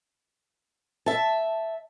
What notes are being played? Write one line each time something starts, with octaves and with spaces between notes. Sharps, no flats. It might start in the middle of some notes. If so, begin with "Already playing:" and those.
E5 A5